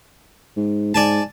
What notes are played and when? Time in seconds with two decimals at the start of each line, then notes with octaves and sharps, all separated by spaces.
0.56 G#2
0.94 G#2 D5 G#5 A5